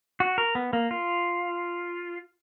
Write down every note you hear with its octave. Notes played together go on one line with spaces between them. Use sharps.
F#4
A#4
B3
A#3
F4